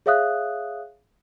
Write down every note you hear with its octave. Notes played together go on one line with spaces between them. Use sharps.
G#4 C#5 E5 F5 D#6 F#6